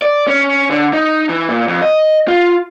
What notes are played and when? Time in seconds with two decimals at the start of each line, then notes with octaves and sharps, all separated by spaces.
0.02 D5
0.28 C#4
0.70 D3
0.93 D#4
1.29 E3
1.49 A#2
1.68 F2
1.82 D#5
2.28 F4